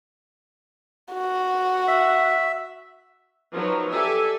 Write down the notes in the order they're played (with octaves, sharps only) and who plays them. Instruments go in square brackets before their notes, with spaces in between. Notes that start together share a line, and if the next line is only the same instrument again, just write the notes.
[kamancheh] F#4
[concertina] E5
[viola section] F3 F#3 D#4 A#4 B4
G4 A4 D5 E5 G#5